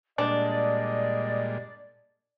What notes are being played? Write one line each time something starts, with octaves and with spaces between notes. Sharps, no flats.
A#2 G3 G#3 D4 D5 D#5